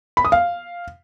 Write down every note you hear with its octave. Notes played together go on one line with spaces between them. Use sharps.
B5
D#6
F5